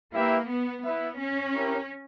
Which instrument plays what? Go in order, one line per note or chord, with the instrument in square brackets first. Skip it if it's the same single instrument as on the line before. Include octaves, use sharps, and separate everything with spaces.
[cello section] A#3 [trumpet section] E4 G4 B4 E5
[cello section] B3
[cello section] B3 [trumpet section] E4 B4 E5
[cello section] C#4
[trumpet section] E4 G4 A#4